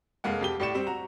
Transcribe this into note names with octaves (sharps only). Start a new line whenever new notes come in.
F1 G#3 A#3 F#5
F2 G4 G7
A2 G4 D5 D6 C#7 E7
G3 C4
F#4 A#5